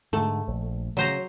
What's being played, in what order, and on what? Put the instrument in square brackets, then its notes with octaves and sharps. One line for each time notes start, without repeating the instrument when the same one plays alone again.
[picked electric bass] G#2 D3 [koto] A3
[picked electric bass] A#1
[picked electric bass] C#3 [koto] F#3 C5 A#5